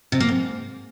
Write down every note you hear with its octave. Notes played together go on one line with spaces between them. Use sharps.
C3
A#3
G#2